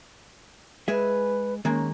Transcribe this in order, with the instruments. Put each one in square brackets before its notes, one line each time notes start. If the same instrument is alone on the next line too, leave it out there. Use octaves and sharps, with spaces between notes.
[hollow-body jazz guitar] G#3 G#4 E5 [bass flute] B4
[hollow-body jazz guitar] D#3 G#3 A#3 [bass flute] C#4